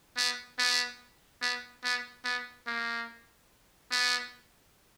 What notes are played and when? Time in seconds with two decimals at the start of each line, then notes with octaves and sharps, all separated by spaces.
0.17 B3
0.59 B3
1.42 B3
1.83 B3
2.25 B3
2.67 A#3
3.91 B3